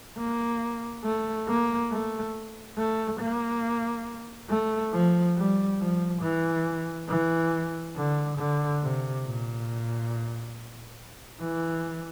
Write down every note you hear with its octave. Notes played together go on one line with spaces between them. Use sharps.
A#3
A3
A#3
A3
A3
A#3
A3
F3
G3
F3
E3
E3
D3
D3
C3
A#2
E3